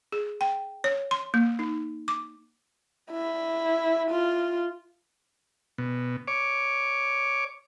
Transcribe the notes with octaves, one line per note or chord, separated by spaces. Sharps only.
G#4
G5
C#5
C6
A#3
D#4
D6
E4
F4
B2
C#5 D6